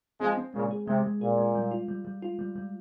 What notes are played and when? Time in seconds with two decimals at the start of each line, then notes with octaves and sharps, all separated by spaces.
0.20 F3 G#3 C4
0.37 C4
0.53 A#2 C#3 G#3
0.71 G#4
0.87 C3 G#3
1.04 G#3
1.21 A#2 G#4
1.38 G#3
1.55 G3
1.71 F4
1.88 G3
2.05 G3
2.22 F4
2.39 G3
2.56 G3